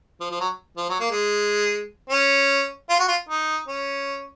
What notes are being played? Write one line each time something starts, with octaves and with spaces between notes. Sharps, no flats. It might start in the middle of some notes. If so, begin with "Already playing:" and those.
F3
F3
F#3
F3
F#3
A#3
G#3
C#4
F4
F#4
F4
D#4
C#4